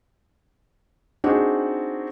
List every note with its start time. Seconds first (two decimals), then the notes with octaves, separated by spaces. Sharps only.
1.24 C4 D4 D#4 F#4 G#4